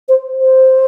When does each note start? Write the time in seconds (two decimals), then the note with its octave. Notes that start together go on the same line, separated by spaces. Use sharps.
0.09 C5
0.41 C5